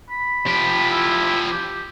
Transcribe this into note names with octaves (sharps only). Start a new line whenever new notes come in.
B5
F3 G4
E4
G4